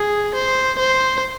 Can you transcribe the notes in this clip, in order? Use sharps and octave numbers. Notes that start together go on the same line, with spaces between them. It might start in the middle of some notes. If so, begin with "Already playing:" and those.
Already playing: G#4
C5
C5